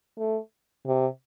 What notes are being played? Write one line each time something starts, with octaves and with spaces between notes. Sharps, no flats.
A3
C3